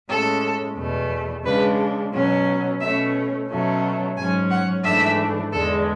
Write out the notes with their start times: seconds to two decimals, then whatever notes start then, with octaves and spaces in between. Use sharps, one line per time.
0.09 A2 G#3 C#4 A4
0.77 E2 B2 A3
1.45 C#3 G#3 D4 B4
2.13 B2 F#3 C#4
2.81 B2 A3 C#4 E5
3.48 B2 F#3 A3 C#4
4.16 G#2 F#3 C#4 G#5
4.50 F#5
4.84 G#2 E3 A3 D4 E5
5.52 E2 D3 G#3 A4